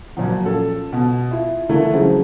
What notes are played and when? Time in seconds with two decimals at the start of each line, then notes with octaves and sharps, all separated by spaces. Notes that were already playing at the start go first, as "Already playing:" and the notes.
0.17 A#2 F3 F#3
0.45 C#4 F4 A4
0.93 B2
1.31 E4 F4
1.69 D3 E3 A3 E4 F4 A#4
1.93 C#3 F3 F#3 G#3 C4 C#4